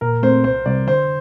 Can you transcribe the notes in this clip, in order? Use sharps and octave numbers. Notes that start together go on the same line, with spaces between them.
A#2 A#4
A3 C4 C5
C2 C5
C3 G3 D5
D3 C5